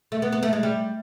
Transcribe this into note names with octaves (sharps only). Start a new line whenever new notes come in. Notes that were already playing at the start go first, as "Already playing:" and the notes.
A3
B3
B3
A3
G#3
G3